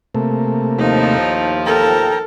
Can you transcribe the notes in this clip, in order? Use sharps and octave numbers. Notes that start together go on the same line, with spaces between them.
C3 A3 A#3
D#2 A2 F3 D#4
A4 A#4 G5 A#5